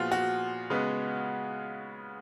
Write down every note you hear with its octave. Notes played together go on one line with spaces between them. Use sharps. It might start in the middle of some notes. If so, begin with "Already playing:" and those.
Already playing: A#2 F3 B3 F4 F#4 G#4
F#4
C#3 G#3 B3